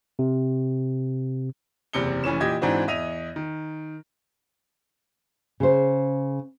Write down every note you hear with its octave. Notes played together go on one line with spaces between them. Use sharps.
C3
F#1 E2 C3 C#7 G7
F1 E3 C#4 E7
A#2 E3 G4 D#5 G#6
G#2 E3 C4 D4 F#4
E2 D#5 E5 D#7 F7
D#3
C#3 C5